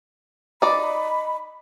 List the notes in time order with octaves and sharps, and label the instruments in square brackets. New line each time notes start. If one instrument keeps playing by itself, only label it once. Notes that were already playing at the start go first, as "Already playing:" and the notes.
[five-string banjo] D#4 D5 [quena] B5